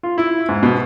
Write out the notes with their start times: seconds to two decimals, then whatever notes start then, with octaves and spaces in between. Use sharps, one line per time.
0.03 F4
0.18 E4
0.49 G#2
0.63 B2